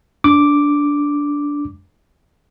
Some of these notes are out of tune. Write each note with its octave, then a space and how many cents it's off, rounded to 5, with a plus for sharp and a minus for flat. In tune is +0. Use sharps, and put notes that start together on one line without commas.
D4 -15 D6 +0